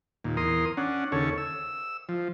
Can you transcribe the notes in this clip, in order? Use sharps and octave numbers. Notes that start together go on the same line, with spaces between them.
D#2 A#2
E2 A#4 C6 D#6
C#4 D4 F#5
D#2 C#3 A4 C#5
E6
F3